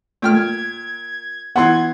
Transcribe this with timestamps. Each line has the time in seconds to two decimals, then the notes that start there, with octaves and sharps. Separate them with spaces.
0.22 A#2 A3 G5 F6
0.34 G#6
1.56 E3 B3 F#5 C6 G#6